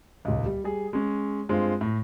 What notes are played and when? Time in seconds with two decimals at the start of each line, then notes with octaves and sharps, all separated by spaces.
0.25 D#1 C#2
0.46 G3
0.64 G3 G#4
0.93 G#3 C#4
1.49 G2 G#3 C4 F4
1.81 A2